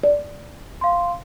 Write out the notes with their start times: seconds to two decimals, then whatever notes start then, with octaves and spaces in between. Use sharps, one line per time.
0.04 D5
0.81 F5 C6